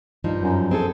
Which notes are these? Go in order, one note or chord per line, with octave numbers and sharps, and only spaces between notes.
G2 F3 D#4
F#2
C4 G#4 A4